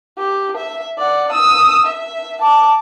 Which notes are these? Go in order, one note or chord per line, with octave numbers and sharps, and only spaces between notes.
G4
E5
D5 F#5
D#6 E6
E5
A5 D6